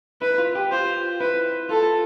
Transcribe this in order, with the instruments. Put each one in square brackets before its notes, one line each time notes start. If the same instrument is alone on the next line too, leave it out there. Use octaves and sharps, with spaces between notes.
[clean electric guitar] E4 [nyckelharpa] B4
[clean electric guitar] F4
G4
[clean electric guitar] F4 [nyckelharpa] C5
[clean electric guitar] E4 [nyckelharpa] B4
[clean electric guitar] F4 [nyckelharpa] A4